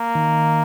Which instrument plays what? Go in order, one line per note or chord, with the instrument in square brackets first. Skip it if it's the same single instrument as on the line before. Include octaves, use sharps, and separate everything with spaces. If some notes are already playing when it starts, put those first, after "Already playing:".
Already playing: [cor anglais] A#3
[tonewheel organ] D#3